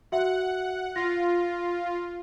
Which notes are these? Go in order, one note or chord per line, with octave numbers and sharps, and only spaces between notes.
F#4 E5 F#5
F4 A#6